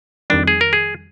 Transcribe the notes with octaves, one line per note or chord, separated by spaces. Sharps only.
F2 D#3 G3 D4
G#4
A#4
G#4